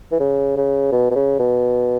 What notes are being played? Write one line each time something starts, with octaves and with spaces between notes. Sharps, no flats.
E3
C#3
C#3
B2
B2
C#3
B2